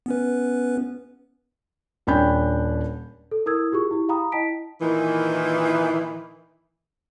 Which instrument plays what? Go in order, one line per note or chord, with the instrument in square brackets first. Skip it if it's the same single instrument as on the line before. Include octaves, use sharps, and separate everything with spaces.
[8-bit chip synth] B3 C#4 B4
[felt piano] D#1 C#4 D4 G5 B5 G6
[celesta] A4
E4 A#4 D#6 E6 G#6
F4 G4 G#4 C#6
E4 G4
F5 G5 A#5 B5 D#6
E4 D#5 G5 A5 B6 D7
[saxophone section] A#2 D#3 E3